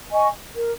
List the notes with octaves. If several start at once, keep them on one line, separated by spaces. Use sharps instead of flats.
D#5 G#5 C#6
A#4